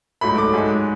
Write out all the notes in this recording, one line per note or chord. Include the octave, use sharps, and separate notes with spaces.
G#2 F#3 A3 B5
D6
G#2 G#3